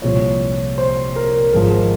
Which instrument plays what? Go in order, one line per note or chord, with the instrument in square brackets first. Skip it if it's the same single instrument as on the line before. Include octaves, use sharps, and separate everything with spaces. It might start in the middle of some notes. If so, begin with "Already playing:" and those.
[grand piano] C2 A#2 F3 C#5
C5
A#4
G#1 G#2 F3 A#4